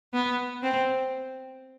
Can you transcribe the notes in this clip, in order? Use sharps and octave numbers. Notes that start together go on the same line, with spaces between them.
B3
C4